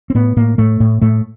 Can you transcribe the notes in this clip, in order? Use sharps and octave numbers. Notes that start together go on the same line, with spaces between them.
C4
A2 B3
A2 A#3
A2 A3
A2
A2 A3